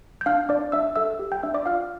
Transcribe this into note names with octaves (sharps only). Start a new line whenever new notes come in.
G6
D4 F5 F6
D4 D5 D6
D4 E5 E6
A4 E5 E6
G4
G5 G6
D4 E5 E6
D5 D6
F4 F5 F6